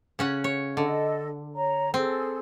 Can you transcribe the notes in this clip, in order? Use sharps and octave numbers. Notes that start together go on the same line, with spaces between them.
C#3 C#4 F#5
C#5
D3 A4 D#5
C#5 A#5
C4 G#4 A4